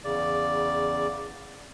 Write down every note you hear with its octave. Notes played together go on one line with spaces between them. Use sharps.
E2 C#3 D5